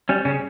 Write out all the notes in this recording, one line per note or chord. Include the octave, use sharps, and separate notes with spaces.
G3 C#4
C#3 C#4